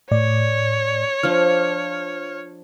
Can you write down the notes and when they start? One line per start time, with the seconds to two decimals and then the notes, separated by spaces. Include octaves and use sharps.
0.11 A2 C#5 D5
1.23 F3 D4 F6